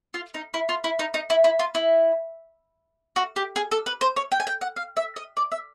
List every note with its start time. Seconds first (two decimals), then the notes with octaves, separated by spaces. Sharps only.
0.14 F4
0.34 D#4
0.54 E4
0.69 F4
0.84 E4
0.99 D#4
1.14 D#4
1.30 E4
1.44 E4
1.59 F4
1.75 E4
3.16 F#4
3.36 G4
3.56 G#4
3.71 A4
3.86 B4
4.01 C5
4.16 C#5
4.32 G5
4.40 G#5
4.47 G5
4.61 F#5
4.76 F5
4.97 E5
5.16 D#5
5.37 D5
5.52 E5